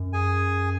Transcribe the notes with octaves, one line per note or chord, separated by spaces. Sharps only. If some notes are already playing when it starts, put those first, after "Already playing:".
Already playing: F#2
G#4 G#5